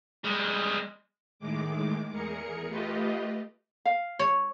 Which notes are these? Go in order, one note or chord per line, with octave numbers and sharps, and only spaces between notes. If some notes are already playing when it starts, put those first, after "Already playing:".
G3 G#3
A2 D#3 G#3 D6
E2 G#4 A#4 C#7
A3 F4 G4 B4 D#5
F5
C#5